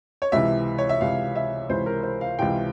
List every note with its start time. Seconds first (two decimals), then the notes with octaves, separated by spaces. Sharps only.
0.22 C#5
0.32 C#2 C3 E3 E5
0.78 C#5
0.89 E5
1.01 C#2 C3 E3 F5
1.36 E5
1.69 C#2 C3 E3 C5
1.86 A#4
2.03 C5
2.21 F5
2.39 C#2 C3 E3 G5